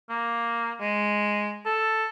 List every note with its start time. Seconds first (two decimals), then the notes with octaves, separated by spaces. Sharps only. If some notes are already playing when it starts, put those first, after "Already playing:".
0.10 A#3
0.80 G#3
1.66 A4